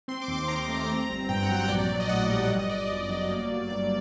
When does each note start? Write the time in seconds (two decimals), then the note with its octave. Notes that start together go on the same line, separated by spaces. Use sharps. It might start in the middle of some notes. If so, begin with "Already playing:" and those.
0.08 C4 C6
0.22 D6
0.28 D#2
0.35 C6
0.48 D#3 A#5
0.68 A3
0.89 C4
1.09 G1
1.29 G2 G5
1.43 F#5
1.49 F#3
1.55 F#5
1.69 A#1 D5
1.79 D5
1.89 A#1 D5
2.00 D#5
2.09 A2 F#5
2.18 D#5
2.26 G3 F#5
2.50 G1
2.59 D#5
2.69 G1 D5
2.80 D5
2.90 F#2
3.10 F#3
3.30 A#3
3.50 G1
3.70 G2 D5